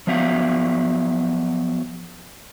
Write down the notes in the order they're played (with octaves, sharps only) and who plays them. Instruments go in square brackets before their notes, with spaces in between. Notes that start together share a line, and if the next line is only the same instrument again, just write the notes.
[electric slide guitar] F3 F#3 B3 E5 F5